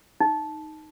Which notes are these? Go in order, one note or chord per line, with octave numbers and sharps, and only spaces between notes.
D#4